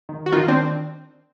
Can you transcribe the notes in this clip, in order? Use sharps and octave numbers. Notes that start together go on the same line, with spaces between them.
D#3
F#4
D#3 D#4 F4
C4 D4